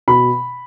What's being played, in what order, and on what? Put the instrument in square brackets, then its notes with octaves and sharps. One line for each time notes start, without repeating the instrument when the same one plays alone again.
[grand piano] B2 B5